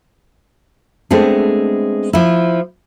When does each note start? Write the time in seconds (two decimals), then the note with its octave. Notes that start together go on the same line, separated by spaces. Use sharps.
1.11 G#3 A3 B3 C4 D4
2.13 F3 E4